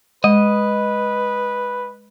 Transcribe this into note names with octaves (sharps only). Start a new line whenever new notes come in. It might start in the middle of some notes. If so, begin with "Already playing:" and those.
G#3 B4 D#5